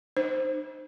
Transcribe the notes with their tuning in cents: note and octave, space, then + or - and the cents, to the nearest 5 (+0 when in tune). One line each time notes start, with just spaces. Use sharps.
D#4 -35 C5 +0